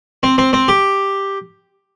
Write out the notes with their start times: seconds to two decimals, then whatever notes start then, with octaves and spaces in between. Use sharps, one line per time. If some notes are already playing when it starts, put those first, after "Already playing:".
0.23 C4
0.38 C4
0.53 C4
0.68 G4